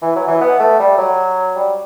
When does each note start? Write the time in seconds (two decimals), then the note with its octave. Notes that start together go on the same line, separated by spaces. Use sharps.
0.02 E3
0.16 F#3
0.28 E3
0.41 B3
0.59 A3
0.79 G3
0.98 F#3
1.56 G3